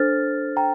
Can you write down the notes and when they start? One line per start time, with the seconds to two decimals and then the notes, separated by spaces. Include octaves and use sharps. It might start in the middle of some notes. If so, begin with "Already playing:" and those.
Already playing: D4 A4 C5 F6 A6
0.57 G5 A#5